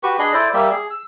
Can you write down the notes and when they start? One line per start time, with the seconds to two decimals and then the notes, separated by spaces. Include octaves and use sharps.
0.03 F#4 G4 B4 C#6
0.19 D4 G#4 D#5 B5
0.34 E4 A4 C5 D5
0.54 G3 A#3 G4 E5
0.71 G#4
0.91 E6